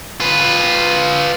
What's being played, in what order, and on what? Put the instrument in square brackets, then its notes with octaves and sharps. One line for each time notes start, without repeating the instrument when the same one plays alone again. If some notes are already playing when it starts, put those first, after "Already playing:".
[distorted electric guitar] F4 B4